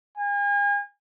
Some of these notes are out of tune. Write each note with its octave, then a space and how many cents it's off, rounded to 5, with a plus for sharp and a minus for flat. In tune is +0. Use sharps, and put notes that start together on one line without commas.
G#5 -40